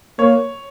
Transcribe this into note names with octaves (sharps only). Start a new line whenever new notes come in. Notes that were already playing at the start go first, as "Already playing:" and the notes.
A#3 C#5